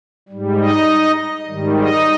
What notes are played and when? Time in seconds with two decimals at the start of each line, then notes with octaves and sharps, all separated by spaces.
0.29 G#2 G3
0.58 D#4 D#5
1.47 G#2 D#3 G3
1.77 D#4 D#5